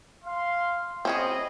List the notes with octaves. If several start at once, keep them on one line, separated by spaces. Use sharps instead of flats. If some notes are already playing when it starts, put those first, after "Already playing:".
F5 C6
C4 C#4 E4 G#4 D#5